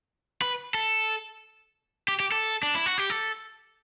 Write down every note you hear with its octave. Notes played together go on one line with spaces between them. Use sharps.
B4
A4
G4
G4
A4
D4
E4
F#4
G4
A4